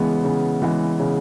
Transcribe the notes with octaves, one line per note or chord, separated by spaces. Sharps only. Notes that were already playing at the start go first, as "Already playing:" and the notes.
Already playing: C#3 E3 G#3 B3
C#3
E3 G#3 B3
C#3